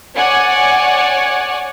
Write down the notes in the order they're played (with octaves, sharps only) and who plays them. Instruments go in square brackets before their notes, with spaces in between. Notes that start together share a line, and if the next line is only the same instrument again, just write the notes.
[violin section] C#5 D5 F#5 G#5